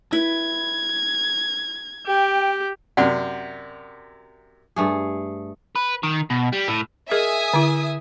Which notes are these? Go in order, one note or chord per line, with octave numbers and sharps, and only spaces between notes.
E4 B4 G#6
G4 G5
F#2 C3 D5 F#5
G2 A3 G#4
B4
D#3
B2
G3
A2
G#4 A#4 D#5 E5 G#5 D#6
D3 E4